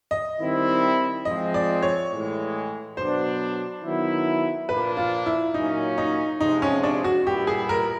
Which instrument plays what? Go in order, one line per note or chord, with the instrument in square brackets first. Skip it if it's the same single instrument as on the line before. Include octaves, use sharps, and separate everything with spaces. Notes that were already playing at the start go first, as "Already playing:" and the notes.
[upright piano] D#5
[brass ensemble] D#3 G3 C4 E4
[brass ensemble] F3 G#3 C4 [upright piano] D#5
[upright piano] D5
C#5
[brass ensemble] A2 E3 G#3
[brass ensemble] B2 F#3 B3 D4 [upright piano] C5
[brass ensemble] D#3 F#3 B3 E4
[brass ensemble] A#2 F3 A#3 D4 [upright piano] B4
[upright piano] F4
E4
[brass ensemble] A#2 F#3 A#3 C#4 [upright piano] D#4
[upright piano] D#4
[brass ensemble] C3 F3 G#3 [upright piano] D#4
[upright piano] C#4
D4
F#4
[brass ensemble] A#2 G3 B3 E4 [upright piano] G4
[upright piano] G#4
A#4